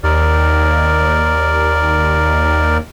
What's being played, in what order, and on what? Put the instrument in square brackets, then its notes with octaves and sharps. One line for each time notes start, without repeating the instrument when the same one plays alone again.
[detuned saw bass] D#2 [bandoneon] A#4 D5